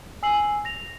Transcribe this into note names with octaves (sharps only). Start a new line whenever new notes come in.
G#5 E6 C7 F#7
A#6 F7